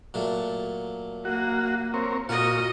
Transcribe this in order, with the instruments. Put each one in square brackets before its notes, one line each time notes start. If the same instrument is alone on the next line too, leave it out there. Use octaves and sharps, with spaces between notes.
[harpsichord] A#2 F#3 A3
[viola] A#3 [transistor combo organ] F#4
[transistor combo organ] C4 A#4 C#5
[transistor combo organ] A#2 F4 [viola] F#4 D#5 [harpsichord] F#5 G#5